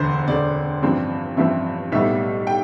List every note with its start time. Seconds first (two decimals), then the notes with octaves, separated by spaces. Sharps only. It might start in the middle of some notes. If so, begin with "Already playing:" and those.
Already playing: E1 D2 D3 C5
0.28 E1 D2 D3 D5
0.82 A1 G2 F3 C4
1.37 A1 G2 F3 C4 E5
1.92 B1 A2 G3 B3 E5
2.47 G5